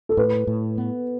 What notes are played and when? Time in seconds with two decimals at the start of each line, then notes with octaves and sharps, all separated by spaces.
0.09 A4
0.17 A2 B4
0.47 A2
0.78 B3